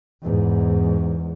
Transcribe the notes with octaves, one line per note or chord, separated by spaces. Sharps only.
E2 G#2